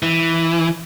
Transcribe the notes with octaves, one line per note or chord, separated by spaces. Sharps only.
E3